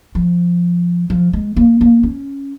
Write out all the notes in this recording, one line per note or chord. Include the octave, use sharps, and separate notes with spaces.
F3
F3
G#3
A#3
A#3
C#4